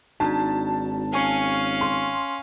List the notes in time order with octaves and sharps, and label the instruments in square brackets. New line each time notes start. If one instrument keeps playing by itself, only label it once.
[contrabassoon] G#1 [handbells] D4 D#4 F#4 [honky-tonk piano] A5
[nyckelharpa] C#4 F5 [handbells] G#5 C#6 C#7
[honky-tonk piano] C6